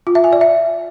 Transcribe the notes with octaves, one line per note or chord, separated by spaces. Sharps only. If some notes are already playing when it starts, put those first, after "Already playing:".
F4
E5
G#5
D5
E5